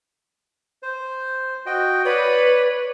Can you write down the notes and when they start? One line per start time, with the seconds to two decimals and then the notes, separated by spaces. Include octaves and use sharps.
0.83 C5
1.66 F#4 D#5 G5
2.05 B4 C#5 D5